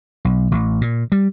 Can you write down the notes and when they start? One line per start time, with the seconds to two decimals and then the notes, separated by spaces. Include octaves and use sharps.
0.25 B1
0.52 A1
0.81 A#2
1.12 G3